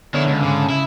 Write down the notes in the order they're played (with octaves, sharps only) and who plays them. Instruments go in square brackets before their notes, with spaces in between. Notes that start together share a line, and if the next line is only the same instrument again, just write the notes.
[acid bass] D3 [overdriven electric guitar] D#3 E4 [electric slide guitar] B3 C#5
[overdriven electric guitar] C#2
[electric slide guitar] G#2 [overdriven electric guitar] C#3
[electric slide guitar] C#3 [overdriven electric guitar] E4